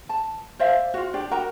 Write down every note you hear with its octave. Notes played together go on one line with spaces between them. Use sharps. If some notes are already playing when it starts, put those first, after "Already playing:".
A5
C5 D5 E5 F5
F4 F#4
D4 G4 D5
F#4 A#4 G5 A#5